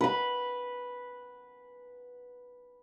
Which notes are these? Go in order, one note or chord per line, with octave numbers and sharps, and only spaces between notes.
B4 B5